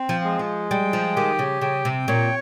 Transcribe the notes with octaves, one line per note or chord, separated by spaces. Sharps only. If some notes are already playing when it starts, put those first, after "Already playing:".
Already playing: C4
F3
G#3
F3
G3 G5
F3
D#3 G4
C#3
C#3 G5
C3
A#2 C#5